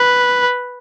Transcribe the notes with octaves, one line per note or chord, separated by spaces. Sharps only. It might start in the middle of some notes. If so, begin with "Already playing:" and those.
Already playing: B4